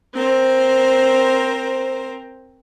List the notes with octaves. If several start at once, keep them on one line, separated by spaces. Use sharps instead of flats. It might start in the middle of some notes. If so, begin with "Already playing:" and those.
C4 A#4 C5